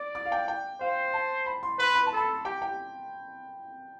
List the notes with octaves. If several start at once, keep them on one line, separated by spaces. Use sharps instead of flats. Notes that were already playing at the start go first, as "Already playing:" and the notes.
Already playing: D5 D6
D6
F5
G5
G5
C5 F5
A5
B5
C6
B4 C6
B5
A5
A4 B5
G4 G5
G5